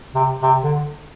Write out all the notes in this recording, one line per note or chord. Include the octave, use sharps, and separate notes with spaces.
C3
C3
D3